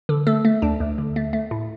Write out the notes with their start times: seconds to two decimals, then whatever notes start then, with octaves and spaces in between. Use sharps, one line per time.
0.09 D3 A4
0.27 A3 A4
0.45 A3
0.62 D2 D4
0.80 D2
0.98 D3
1.16 A3
1.33 A3
1.51 A2